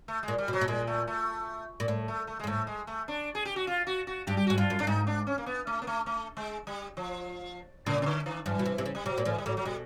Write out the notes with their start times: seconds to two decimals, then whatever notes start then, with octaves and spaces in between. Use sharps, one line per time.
0.08 A3
0.23 G#3
0.28 A#2
0.38 G3
0.48 B2
0.53 F#3
0.61 B2
0.68 A#2 G#3
0.87 A3
1.07 A3
1.80 A#2
1.88 A2
2.08 A3
2.27 A3
2.39 G#3
2.44 G#2
2.47 A2 A3
2.67 G#3
2.87 A3
3.08 D4
3.35 G#4
3.45 G4
3.56 F#4
3.67 F4
3.87 F#4
4.07 F#4
4.27 G2 G4
4.37 G4
4.47 G#2 F#4
4.57 G2 F4
4.70 F#2
4.79 G2 D4
4.87 G#2 D#4
5.07 D4
5.27 C#4
5.38 A#3
5.46 B3
5.67 A3
5.82 A#3
5.87 A3
6.06 A3
6.37 G#3
6.67 G3
6.97 F3
7.86 A#2 C#3
8.02 C#3
8.06 D3
8.26 D#3
8.46 G2 E3
8.59 B2
8.65 C3
8.78 C3
8.86 C#3
8.95 G3
9.06 C3 F#3
9.18 A#2
9.25 A2 E3
9.38 G3
9.46 A2 F#3
9.57 F#3
9.65 B2 G3